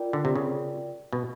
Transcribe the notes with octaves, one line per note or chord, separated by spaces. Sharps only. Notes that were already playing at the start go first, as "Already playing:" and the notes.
Already playing: F4 A#4 D5 G5
D3
C3
C#3
B2